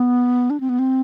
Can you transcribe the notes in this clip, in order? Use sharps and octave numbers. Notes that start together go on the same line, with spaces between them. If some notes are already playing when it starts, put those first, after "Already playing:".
Already playing: B3
D4
C4
B3
C4